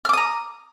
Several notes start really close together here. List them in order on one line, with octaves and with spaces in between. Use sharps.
F6 D6 D#6 A#5